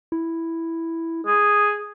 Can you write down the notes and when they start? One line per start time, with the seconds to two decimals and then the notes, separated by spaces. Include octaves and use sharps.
0.12 E4
1.27 G#4